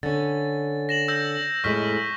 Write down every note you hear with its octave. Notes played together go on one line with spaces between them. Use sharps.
D3 C#4 A6
A#6 E7 F#7
E6 G6 A#6
F2 A2 G#3 C#6 F6 B6